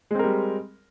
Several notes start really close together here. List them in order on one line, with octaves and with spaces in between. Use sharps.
G#3 C4 A#4 G3